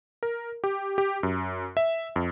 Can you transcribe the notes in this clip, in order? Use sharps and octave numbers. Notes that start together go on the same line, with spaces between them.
A#4
G4
G4
F#2
E5
F2